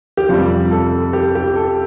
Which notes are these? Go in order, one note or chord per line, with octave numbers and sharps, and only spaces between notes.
G4
F2 C3 G3 F4
A4
G4
G4
A4